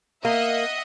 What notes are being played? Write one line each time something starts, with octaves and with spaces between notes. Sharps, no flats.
A#3 D#5 E5 F#5